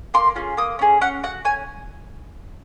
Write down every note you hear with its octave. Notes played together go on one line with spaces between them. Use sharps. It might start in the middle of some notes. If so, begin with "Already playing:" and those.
A#3 C6
C#4 F4 G#4
A#3 D#6
C#4 F4 G#4
C#4 F#5
F#4 F#5
C#4 G#5